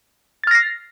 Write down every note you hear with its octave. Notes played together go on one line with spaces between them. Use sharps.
F6 A6 A#6 C7